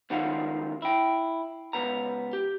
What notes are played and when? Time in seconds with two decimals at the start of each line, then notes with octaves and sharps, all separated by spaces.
0.10 C#2 F#2 D#3 F4 F#5
0.82 E4 G5
1.73 C#2 G2 B3 A#5
2.33 G4